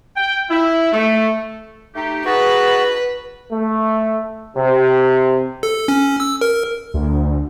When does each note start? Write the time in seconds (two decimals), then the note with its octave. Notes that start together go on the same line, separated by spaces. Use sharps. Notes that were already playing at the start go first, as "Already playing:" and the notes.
0.16 G5
0.51 E4
0.93 A3
1.94 A3 D#4 G4
2.25 D#4 F#4 G#4 B4 A5
3.51 A3
4.57 C3
5.63 A4
5.88 C#4
6.20 E6
6.41 A#4
6.94 D2